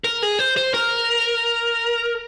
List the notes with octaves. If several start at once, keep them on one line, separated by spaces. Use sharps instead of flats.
A#4
G#4
C5
C5
A#4